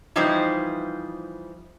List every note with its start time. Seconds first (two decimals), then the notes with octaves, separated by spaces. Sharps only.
0.16 E3 F3 G3 D#4 B4 C5